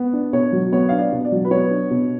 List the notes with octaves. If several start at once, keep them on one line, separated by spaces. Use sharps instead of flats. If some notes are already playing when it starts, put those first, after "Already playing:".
Already playing: B3
D4
B2 C#5
F#3
B3 C#5
D4 F5
D5
B2
D5
F#3
B4
B3 C#5
D4
B2